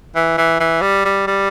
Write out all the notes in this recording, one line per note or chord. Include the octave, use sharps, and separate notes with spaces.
E3
E3
E3
G3
G3
G3